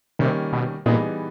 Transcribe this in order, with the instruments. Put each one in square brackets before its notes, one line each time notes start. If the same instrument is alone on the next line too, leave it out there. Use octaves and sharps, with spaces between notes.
[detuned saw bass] C3 [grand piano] D#3 G3 A#3 C#4
[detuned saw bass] B2
[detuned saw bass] A#2 [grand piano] E3 G3 B3 D#4 G#4